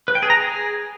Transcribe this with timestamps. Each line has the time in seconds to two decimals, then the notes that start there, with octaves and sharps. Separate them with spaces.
0.08 B4
0.15 G5
0.23 G#4
0.30 A#5
0.37 G#4